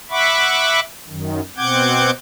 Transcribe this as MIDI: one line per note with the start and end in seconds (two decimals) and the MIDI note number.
0.10 0.80 76
0.10 0.80 78
0.10 0.80 83
0.10 0.80 85
0.10 0.80 86
1.08 1.40 42
1.08 1.40 51
1.57 2.10 47
1.57 2.10 60
1.57 2.10 78
1.57 2.10 86
1.57 2.10 91
1.57 2.10 92